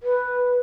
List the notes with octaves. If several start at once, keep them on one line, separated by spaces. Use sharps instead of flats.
B4